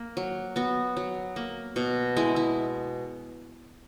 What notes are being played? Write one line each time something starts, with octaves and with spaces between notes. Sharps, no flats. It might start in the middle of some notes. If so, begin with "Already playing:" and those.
Already playing: A#3
F#3
B3 F#4
F#3
A#3
B2
G#3 E4
E4